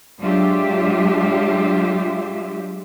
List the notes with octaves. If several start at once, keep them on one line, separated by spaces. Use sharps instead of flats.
F#3 G#3 D4 F4 G4 E5